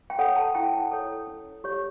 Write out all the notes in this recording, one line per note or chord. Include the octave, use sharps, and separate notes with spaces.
G5
A4 C#5 F#5
A5
E4 G5
A4 C#5
C#4
G4 C#5